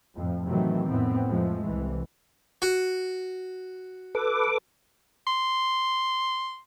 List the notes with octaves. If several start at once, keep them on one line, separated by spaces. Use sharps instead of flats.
F2 A2 F3
A2 C3 D#3 E3 F#3 A3
F2 A2 B3 C4
F2 F3 G#3 A3
C2 E3
F#4
A4 B4 D6
C6